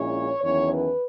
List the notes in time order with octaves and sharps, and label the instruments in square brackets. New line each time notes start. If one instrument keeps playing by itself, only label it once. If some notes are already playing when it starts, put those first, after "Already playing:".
Already playing: [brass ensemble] A#1 A#2 G#3 C#4 E4 C#5
E2 D#3 F#3 C#4 E4 C#5
B4